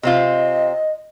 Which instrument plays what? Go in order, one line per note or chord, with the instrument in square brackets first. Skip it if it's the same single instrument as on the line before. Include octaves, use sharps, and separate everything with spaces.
[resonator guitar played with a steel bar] C3 C4 F4 [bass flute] D#5